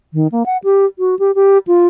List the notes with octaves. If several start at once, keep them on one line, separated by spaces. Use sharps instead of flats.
D#3
A#3
F#5
G4
F#4
G4
G4
F4